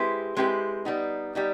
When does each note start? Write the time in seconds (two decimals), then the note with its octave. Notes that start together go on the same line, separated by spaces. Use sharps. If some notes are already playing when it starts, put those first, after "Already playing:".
Already playing: G#3 C4 E4 G4 B4
0.37 G#3 C4 E4 G4 B4
0.85 G3 B3 D#4
1.35 G3 B3 D#4